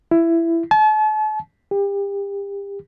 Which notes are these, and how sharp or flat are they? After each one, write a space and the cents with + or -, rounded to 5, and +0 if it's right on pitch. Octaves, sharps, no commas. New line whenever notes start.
E4 +15
A5 -40
G4 +30